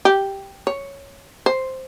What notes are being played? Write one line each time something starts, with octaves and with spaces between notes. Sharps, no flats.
G4
C#5
C5